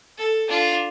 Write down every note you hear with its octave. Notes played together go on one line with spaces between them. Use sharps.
A4
D4 F4